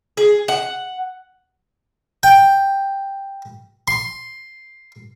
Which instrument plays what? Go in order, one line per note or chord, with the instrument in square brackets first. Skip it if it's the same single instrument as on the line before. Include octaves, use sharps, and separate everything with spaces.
[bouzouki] G#4
F#5
[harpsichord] G5
C6